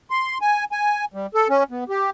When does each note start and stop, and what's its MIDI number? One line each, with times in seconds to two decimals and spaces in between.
0.10 0.38 84
0.41 0.65 80
0.72 1.05 80
1.14 1.26 55
1.34 1.48 69
1.49 1.64 61
1.71 1.84 59
1.89 2.10 67